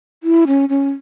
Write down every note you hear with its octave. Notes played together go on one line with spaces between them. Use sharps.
E4
C#4
C#4